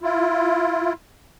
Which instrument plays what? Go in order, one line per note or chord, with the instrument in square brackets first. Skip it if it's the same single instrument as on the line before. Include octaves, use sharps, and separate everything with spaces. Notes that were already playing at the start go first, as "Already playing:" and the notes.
[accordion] E4 F4